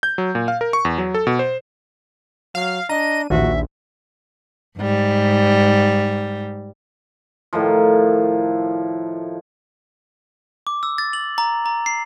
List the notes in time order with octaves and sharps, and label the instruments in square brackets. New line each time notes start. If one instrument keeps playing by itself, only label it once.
[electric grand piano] G6
F#3
A#2
F5
A#4
C#6
E2
F#3
A4
B2
C5
[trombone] F#3 [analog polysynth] F5
[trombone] D4 [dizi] D#5 [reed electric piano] A#5 [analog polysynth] D#7
[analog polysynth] A#1 [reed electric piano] D#2 [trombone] F#4 [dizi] E5
[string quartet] G#2 G3
[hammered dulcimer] A2 D#3 F3
[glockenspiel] D6
E6
A6
F#7
A#5
A#5
C7